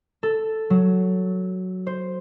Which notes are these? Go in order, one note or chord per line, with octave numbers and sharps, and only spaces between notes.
A4
F#3
C5